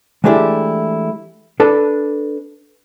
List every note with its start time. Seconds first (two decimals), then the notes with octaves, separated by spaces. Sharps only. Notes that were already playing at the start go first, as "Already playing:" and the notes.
0.24 E3 G#3 A3 D4 E4 G4
1.60 D4 A4 B4